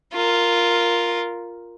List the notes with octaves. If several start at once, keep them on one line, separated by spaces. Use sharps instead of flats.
F4 A#4